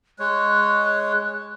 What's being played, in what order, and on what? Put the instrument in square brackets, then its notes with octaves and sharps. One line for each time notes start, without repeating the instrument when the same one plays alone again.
[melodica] G#3 C#5 [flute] F#6